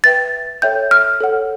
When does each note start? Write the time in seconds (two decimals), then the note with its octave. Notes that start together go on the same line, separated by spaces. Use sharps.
0.04 B4 E5 G5 A6
0.62 A4 C#5 E5 G5 G6
0.91 F6
1.21 A4 C#5 F#5